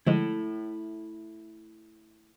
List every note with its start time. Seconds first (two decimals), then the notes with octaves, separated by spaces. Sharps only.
0.06 D3 F3 G#3 A3 E4